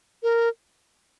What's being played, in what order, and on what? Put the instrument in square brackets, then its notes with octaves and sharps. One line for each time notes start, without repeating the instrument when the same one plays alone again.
[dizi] A#4